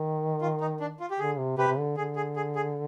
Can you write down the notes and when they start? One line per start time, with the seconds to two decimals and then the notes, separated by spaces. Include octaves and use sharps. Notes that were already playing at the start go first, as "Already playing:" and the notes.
Already playing: D#3
0.41 F4
0.61 D#4
0.80 D4
1.00 F4
1.11 G4
1.19 D3 G#4
1.38 C3
1.57 C3 G4 B4
1.68 C3
1.78 D3
1.97 D3 G#4
2.16 G#4
2.36 G#4
2.56 G#4